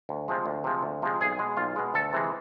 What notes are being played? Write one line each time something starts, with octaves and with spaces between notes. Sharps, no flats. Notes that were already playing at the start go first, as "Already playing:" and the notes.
D2
C3 F3 G#3
D2
C3 F3 G#3
D2
C3 F3 G#3
B1 G#4
B2 G#3
B1 F4
B2 G#3
D2 A4
C3 E3 G#3